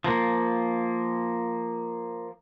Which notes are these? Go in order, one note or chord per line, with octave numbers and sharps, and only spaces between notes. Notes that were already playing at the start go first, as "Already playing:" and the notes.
F3 A#3